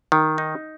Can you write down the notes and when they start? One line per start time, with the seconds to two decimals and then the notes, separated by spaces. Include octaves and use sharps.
0.12 D#3
0.38 D#4